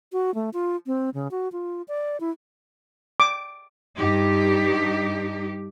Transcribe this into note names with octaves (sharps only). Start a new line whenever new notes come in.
F#4
A3
F4
C4
C#3
F#4
F4
D5
E4
D6
G2 D#4 G4